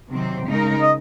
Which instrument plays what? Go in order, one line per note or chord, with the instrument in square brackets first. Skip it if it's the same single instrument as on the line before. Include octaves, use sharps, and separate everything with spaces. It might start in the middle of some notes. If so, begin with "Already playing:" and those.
[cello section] C3 D#3 F#3 C4
C#3 G#3 D#4 A#4
[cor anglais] D#5